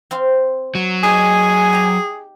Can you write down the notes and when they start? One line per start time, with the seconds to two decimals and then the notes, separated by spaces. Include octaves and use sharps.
0.11 C4 C5 F5
0.75 F#3
1.03 D#4 G4 G#4 G#5
1.73 G4 A#5